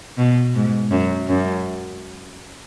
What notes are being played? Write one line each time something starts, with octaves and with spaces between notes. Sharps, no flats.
B2
G#2
F#2
F#2